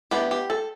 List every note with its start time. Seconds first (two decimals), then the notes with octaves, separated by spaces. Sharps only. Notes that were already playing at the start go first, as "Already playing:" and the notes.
0.11 E3 B3 D4 G4
0.31 G4
0.50 A4